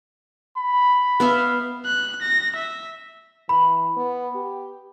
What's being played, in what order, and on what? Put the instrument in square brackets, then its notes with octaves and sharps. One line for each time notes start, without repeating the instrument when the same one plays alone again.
[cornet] B5
[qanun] B3 E5 F5
[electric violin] F#6
A#6
E5
[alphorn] E3 [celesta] B5
[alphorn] B3
G4